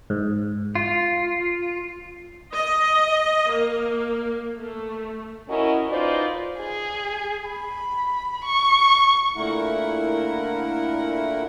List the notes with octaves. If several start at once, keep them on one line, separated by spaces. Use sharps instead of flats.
G#2
F4
D#5
A#3
A3
C#4 E4 F#4 A#4 D#5
D#4 F4 B4 C5 D5
G#4
B5
C#6
A#2 D3 A3 E4 A#4 F#5